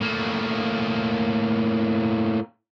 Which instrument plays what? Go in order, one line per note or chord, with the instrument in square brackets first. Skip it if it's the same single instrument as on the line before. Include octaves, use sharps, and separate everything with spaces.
[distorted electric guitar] A2 A#3